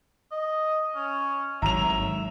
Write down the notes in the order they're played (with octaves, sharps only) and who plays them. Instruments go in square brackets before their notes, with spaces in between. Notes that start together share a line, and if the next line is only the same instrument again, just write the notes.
[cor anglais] D#5
C#4
[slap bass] G#1 C3 F#3 [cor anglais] E5 [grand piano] A#5 F7